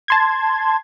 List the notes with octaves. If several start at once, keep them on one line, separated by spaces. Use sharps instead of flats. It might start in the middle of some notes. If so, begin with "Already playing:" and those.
A5 C6 G#6